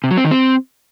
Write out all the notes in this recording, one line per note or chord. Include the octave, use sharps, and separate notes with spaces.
C3
F#3
C4
D#3
C4